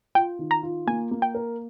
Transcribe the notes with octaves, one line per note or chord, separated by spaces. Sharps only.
F4 G5
D#3
A#5
F4
A#3 G#5
A#3
G5
A#4